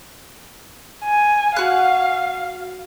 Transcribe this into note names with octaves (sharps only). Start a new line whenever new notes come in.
G#5
F#4 F5 F#6